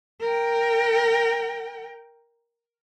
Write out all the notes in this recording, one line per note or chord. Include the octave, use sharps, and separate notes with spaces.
A#4 G5